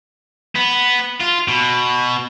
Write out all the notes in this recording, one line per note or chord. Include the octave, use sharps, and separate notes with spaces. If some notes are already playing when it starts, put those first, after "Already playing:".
B3
F4
B2